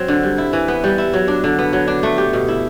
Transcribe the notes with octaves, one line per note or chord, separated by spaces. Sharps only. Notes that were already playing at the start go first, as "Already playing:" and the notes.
Already playing: F#3 C4
D3
G3
E4
E3
B3
G3
E4
F#3
D4
D3
B3
F#3
D4
A3
G4
B2
E4